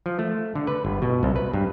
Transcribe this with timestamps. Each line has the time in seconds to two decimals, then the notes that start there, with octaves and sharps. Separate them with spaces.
0.06 F3
0.19 A3
0.56 D3
0.67 B4
0.85 G1
1.02 B2
1.23 C2
1.36 B4
1.54 G2